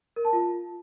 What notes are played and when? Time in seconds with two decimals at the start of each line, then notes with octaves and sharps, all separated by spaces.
0.16 A#4
0.25 A5
0.33 F4